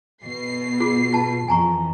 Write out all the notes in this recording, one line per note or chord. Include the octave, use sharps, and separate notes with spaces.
B2 C7
F4 F#4 G#4
F4 A5
F2 E3 G#5 A#5 C#6